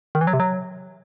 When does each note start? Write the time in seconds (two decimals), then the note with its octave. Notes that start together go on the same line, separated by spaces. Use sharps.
0.15 D#3
0.21 E3
0.27 F#3
0.33 C3
0.40 F#3